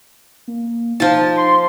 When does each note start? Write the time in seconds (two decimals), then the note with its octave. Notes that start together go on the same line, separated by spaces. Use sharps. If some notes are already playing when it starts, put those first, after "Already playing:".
0.48 A#3
1.00 F3 D#4 A5
1.37 C6